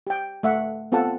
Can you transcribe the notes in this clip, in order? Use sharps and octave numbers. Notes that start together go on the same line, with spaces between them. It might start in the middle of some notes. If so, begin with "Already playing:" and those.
G4 G5
A3 E5 F#5
B3 C4 F4 A4 F#5 A5